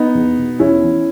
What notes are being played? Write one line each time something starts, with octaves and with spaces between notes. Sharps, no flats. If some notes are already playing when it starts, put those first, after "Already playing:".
Already playing: B3 D#4
E2
B2
E2 C#4 E4
E3